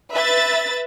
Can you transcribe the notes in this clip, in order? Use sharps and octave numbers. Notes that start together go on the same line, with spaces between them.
B4 E5 A6